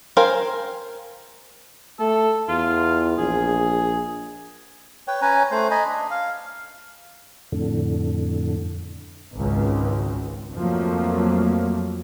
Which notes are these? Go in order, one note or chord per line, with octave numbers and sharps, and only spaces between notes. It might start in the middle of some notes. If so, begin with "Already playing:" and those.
A#4 C5 F5 G5 G#5
A3 A4
E2 F4
A#1 G#4
B4 C#5 G5
C#4 B4 G#5 A#5
A3 C5
D#5 G#5 A#5 B5
D4
F5
F2 A2 D3
G#1 C#2
F2 F3 F#3 A3 A#3